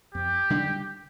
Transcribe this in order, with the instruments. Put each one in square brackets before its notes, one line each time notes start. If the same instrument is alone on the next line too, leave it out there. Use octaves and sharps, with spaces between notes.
[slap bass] F2 [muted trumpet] G4
[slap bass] D3 G3 D4